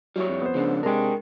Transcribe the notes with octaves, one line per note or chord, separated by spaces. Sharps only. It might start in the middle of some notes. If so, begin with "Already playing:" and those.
F#3 G3 E4 C#5
F2
B3 C5
C#3 F3 C4 D4
C3 G#3 D4 A#4 G5